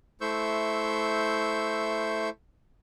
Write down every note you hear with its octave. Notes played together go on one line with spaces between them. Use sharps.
A3 E4 C5 C#6 E6 G6